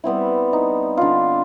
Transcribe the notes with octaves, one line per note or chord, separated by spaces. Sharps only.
G3 B3 C4 E4
D#4
D3 F4